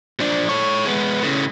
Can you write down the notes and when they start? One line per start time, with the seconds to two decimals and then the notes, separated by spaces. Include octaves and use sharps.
0.20 F3 D4
0.49 A4 C#5
0.86 G#3 B3
1.22 A2 C#3